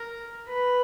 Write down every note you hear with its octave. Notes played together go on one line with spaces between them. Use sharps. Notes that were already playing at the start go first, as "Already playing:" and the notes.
Already playing: A#4
B4